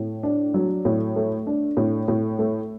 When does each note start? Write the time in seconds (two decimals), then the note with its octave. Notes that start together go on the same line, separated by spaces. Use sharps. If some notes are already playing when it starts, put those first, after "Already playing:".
Already playing: A2
0.23 D4
0.54 F#3
0.85 A2
1.16 A3
1.47 D4
1.77 A2
2.08 A2
2.39 A3